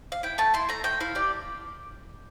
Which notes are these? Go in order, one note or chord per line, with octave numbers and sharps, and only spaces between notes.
F5
E4 G5
A3 A5
E4 C6
A3 A#5
A3 G5
E4 F5
G4 D5